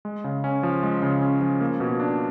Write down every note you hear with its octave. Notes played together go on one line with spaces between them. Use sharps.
G#3
C#3
C#4
F3
G#3
C#3
C#4
F3
A#3
B2
D4